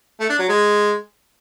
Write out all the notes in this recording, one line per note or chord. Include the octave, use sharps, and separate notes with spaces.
A3
D4
F#3
G#3